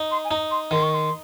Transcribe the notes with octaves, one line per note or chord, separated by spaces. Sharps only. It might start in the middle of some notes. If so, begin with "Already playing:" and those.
Already playing: D#4
C6
G#5
D#4 A#5
C6
D#3 C6
C#6
C6